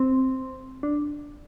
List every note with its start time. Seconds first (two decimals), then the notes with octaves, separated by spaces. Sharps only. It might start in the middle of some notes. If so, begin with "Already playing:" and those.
Already playing: C4
0.83 D4